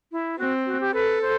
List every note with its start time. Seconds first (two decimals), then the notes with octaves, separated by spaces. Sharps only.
0.12 E4
0.39 C4 F#4
0.66 F#4
0.80 G4
0.94 A4 B4
1.21 C5